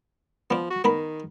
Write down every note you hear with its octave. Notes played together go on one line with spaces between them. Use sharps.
F3 B3 D4
F#4
D#3 B3 A#4 B5